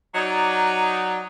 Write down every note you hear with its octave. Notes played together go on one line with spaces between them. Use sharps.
F#3 D#4 D5